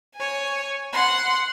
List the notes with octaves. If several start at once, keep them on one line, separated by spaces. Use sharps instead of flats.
C#5 G#5
F#5 C6